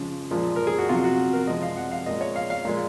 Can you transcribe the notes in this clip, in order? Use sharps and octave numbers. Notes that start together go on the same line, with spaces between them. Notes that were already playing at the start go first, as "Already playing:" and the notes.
Already playing: C#3 F3 G#3 C#4
A#2 F3 G#3
A#4
G#4
F#4
C3 F#3 F4
F#4
A#4
C3 F3 G#3 D#5
F5
F#5
F5
A#2 G#3 D#5
C#5
F5
F5
A#2 G#3